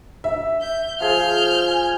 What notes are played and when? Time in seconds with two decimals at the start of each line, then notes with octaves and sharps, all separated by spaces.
0.24 E5
0.62 G6
1.00 F3 G#4 F5 F6 G6
1.67 G#5